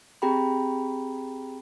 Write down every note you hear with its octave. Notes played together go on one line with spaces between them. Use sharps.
C4 G4 G#4 G5 A#5 B5